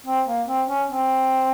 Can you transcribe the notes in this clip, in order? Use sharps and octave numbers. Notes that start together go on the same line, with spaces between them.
C4
A#3
C4
C#4
C4